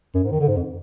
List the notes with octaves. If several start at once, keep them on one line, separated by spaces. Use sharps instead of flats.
F#2
G#2
D#3
D3
G#2
F2